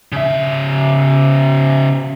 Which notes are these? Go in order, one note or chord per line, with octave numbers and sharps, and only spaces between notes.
C#3 E5